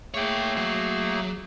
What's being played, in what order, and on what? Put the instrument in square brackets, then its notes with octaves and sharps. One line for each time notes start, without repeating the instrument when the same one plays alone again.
[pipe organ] A3 A#3 G#4 [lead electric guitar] C#5 G5
[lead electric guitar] F#3